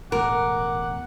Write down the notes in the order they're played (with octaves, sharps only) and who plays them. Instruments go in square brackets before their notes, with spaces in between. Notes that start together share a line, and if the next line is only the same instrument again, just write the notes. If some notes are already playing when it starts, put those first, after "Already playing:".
[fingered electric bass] E1 E2 A2 [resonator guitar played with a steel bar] A#4 [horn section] F#5 [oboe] D6